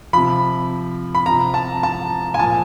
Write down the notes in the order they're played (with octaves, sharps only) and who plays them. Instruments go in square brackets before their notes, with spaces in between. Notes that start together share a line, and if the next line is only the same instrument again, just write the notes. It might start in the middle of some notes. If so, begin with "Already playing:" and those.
[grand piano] C3 F3 B5
B5
C3 F3 A#5
A5
A5
G#5
A#2 F3 A5